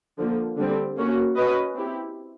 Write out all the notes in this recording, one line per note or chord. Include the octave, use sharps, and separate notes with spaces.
D3 F3 A#3
D3 G3 C4
A#3 C#4 F#4
C#4 F#4 B4 D#5
C4 E4 G4